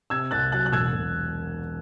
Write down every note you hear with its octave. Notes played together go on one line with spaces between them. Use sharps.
C3 E6 G#6
C2 F#6 A6
F#3 F#6 A6
F#6
E1 E6 G#6
E1